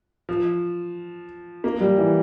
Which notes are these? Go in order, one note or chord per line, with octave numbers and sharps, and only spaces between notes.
F3
A#3
G3
E3